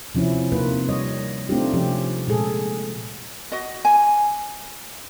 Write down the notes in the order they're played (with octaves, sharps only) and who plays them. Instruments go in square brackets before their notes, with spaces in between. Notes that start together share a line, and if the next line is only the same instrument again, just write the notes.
[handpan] C3 F3 C#4 E4
C3 A#3 D#4 F4 B4
G3 C#5 D#5
A3 C4 D4 D#4 F4 G4
C3 F3 C#4 G4
A#2 G#3 G#4 A4
[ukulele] F#4 D#5
G#5